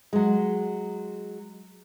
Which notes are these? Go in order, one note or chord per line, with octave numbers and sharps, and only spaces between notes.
F#3 G#3